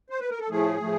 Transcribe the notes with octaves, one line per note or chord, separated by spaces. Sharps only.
C5
B4
A#4
A4
A2 F3 A3 G#4
A2 F3 A3